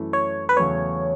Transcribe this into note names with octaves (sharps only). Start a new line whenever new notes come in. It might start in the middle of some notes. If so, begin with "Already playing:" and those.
Already playing: F#2 E3 A3 C#4 E4
C#5
B4
E2 C#3 F#3 A3 C#5